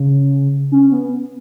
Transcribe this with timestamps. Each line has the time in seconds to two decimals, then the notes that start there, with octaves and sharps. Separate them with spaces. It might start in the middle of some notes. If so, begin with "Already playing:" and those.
Already playing: C#3
0.72 C#4
0.91 B3